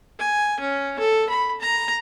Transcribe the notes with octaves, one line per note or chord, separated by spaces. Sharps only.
G#5
C#4
A4
B5
A#5